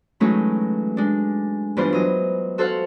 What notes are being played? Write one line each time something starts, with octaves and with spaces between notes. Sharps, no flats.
E3 F#3 G#3 A3 C#4 D#4
G#3 D4
G2 E3 B3 D4 F4 C5
F#3 D#5
F#4 A4 C5 F5 F#5